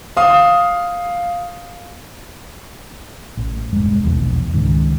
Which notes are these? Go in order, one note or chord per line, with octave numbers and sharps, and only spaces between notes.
F5 D#6
A1
E1 G2 G#3
F1 B1 E2
C#2 G#2 D#3